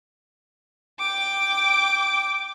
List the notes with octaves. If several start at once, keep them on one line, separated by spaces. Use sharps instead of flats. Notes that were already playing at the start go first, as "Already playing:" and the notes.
G5 D6